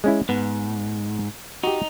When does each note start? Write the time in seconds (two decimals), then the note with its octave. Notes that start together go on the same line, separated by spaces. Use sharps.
0.04 G#3 C#4 E4
0.29 G#2 B3
1.63 D#4 F#4 G4